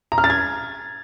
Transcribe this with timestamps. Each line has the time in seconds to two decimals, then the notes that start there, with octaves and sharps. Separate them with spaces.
0.12 A#5
0.18 F6
0.24 A6
0.30 G#6